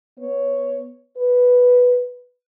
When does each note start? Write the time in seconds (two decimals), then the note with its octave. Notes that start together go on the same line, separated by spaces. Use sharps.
0.18 B3 C#5
1.16 B4